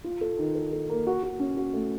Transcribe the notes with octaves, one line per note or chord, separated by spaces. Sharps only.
F4
A4
D#3
A4
A4
A#3
F#4
F#4
C#4
F#4
A3